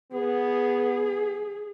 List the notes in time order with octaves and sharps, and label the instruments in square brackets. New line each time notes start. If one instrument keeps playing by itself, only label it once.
[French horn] B3 [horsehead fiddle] G#4